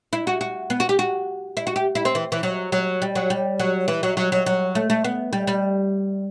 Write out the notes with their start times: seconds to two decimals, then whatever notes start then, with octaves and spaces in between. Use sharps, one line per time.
0.13 E4
0.27 F#4
0.41 F#4
0.70 B3
0.80 F#4
0.89 G4
0.99 F#4
1.57 E4
1.67 F#4
1.76 G4
1.95 E4
2.05 C4
2.15 E3
2.32 E3
2.43 F#3
2.72 F#3
3.02 G3
3.15 F#3
3.30 G3
3.59 F#3
3.88 E3
4.03 F#3
4.17 F#3
4.32 F#3
4.46 F#3
4.75 A3
4.90 A3
5.04 B3
5.33 G3
5.47 G3